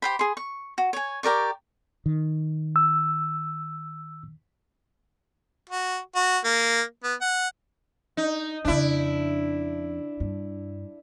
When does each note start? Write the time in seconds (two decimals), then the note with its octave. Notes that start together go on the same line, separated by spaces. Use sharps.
0.02 G4 C5 B5
0.19 G#4 C6
0.37 C#6
0.78 F#4
0.93 C#5 G#5
1.23 G4 A#4 D5 C#6
2.06 D#3
2.76 E6
5.70 F#4
6.16 F#4
6.45 A#3
7.04 B3
7.21 F#5
8.17 D#4
8.65 F2 C#3 D4 E4
10.20 G2